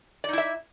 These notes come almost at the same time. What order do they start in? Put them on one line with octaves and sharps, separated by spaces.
D5 D#4 E4 E5